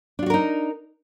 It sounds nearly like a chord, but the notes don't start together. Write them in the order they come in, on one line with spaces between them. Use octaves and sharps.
D4 F4 F#4 A#4 D#4